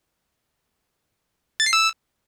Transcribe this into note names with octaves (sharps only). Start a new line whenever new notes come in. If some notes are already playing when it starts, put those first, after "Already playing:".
A6
C7
E6